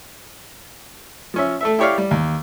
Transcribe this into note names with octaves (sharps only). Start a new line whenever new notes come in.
F3 C#4 E5
A3 A4 E5
E4 G4 C#5 D5 F5
G3
D#2